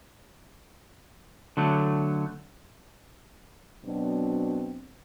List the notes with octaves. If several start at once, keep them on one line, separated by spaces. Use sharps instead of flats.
D3 F#3 A3
B2 F#3 C4 D4